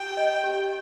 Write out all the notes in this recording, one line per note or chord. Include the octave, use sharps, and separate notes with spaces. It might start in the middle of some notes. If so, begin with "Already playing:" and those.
Already playing: G4 G5
D#5
G4